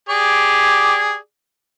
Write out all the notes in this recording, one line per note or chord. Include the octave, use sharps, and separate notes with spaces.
G4 G#4 D5